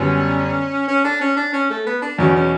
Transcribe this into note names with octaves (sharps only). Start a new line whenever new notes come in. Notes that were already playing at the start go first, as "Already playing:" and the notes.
Already playing: F#2 D3 G3 B3 C#4
C#4
D4
C#4
D4
C#4
A3
B3
D4
E2 B2 F#3 C#4
C#4